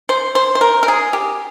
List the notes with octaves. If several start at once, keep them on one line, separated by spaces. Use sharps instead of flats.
C5
C5
C5
A#4
A#4
G#4
G4